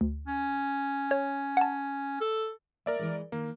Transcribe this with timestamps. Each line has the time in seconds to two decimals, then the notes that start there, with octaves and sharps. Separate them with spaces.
0.01 D2
0.27 C#4
1.11 C#5
1.57 F#5 A5
2.21 A4
2.86 A#3 A#4 D5 E5
2.99 E3 F3 G#3
3.32 D#3 A#3